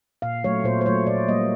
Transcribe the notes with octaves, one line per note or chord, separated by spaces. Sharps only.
A#2 F5
F#3 A3 C#5
A#2 C5
C5
F#3 A3 C#5
A#2 D5
G3 A#3 D#5